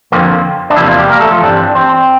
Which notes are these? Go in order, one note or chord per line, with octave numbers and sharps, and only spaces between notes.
F2 D3 F3 A#3 C4
D4
E2 C3 E3 F3 A#3 E4
F3 F4
G3 G4
A#3 A#4
A3 A4
F3 F4
G2 E3 G3 C4 D4
C4